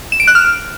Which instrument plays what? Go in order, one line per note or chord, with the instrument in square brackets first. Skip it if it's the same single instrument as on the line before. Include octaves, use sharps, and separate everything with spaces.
[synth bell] E7
D7
F#6
F6